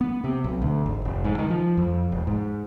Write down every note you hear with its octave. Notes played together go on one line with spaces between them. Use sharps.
B3
C3
B1
D2
G#1
F1
G#2
D#3
F3
F2
E1
G#2